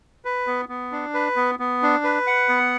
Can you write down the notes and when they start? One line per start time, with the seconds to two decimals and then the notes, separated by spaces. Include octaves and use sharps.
0.25 B4
0.47 B3
0.69 B3
0.92 D4
1.14 B4
1.36 B3
1.59 B3
1.82 D4
2.04 B4
2.27 F#5
2.49 B3